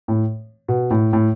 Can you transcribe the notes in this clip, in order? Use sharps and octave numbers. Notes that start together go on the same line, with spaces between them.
A2
B2
A2
A2